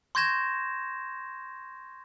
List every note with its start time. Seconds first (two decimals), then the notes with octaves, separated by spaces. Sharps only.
0.15 C6 C#6 G6 G#6 A#6 E7